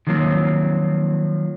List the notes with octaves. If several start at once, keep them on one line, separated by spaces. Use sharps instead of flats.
D#3 F3 F#3 A#3 C4